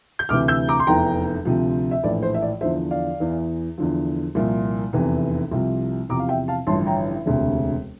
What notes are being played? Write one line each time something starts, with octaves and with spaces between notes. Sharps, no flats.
G6
D2 C3 E3 D6 F6
E6 G6
A#5 D6
C6
F1 E2 E3 G5 A#5
D2 C3 F3
E5
A#1 A2 E3 D5
C5
E5
D5
E2 D3 F3 C5 E5
D5 F5
E2 E3
E2 D3 F3
C2 A#2 F3
F1 E2 C3 E3
C2 C3 F3
E2 C3 F3 A#5 D6
F5
E5 G5
F5 A5
A1 G2 D3 F3 A5 C6
G5 A#5
E1 D2 C3